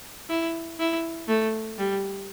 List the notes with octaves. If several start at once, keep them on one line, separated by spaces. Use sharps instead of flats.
E4
E4
A3
G3